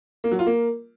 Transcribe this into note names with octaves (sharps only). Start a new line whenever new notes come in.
A#3
F#3
F4
A#3